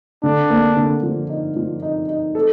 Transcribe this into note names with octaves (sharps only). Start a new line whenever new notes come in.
D3 D4
A#3
D3
F3
D#4
F3
D#4
D#4
A4